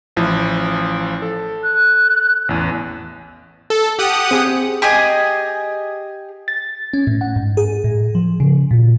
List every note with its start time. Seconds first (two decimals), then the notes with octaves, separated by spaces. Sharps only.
0.17 A1 F3 E4
1.22 A4
1.63 F#6
2.49 A1 E2
3.70 A4
3.99 G4 F#5 D#6
4.31 C4 G#4
4.82 G4 G#4 D#5 G#5
6.48 A6
6.93 C#4
7.07 A2
7.21 F#5
7.36 G#2
7.57 G#4
7.84 A2
8.15 F3
8.40 C#3
8.71 A#2